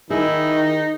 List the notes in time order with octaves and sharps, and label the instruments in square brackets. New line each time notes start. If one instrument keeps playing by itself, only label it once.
[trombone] D#3 [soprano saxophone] D#4 [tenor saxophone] E4 [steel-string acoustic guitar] G#4